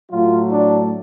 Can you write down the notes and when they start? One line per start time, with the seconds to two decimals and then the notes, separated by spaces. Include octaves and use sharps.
0.11 A2 F#3 A3 F4
0.51 D4